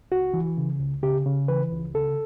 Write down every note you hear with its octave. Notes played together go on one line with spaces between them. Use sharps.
C#2 F#4
E3
C#3
C#2
C#3 G4
C#3
E3 B4
C#2
C#3 A4